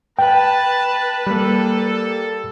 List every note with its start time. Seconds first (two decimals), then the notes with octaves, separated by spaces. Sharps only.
0.19 B4 G5 A5
1.26 G3 A#3 A4